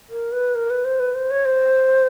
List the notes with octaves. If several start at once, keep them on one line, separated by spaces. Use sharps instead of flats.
A#4
B4
A#4
B4
C5
B4
C5
C#5
C5